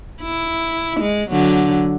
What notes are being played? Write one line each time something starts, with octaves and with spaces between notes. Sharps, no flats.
E4
G#3
D3 F#3